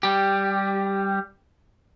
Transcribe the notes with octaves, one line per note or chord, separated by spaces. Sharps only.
G3 G4